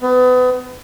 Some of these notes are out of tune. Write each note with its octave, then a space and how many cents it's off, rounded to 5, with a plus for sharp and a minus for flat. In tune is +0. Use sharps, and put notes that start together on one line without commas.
B3 +30